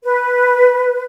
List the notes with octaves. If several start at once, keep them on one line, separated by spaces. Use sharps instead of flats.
B4